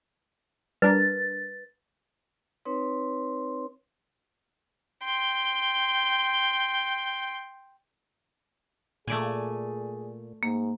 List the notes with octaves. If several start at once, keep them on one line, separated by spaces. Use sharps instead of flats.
G3 D4 A#4 B4 A6
C4 D#4 B4 C#5 C6
G5 C6
A#2 A3 G#4 D5 G#5
G#2 A#3